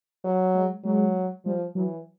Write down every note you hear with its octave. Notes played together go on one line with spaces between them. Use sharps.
F#3
G#3
F#3 G#3
F3 G3
E3 F#3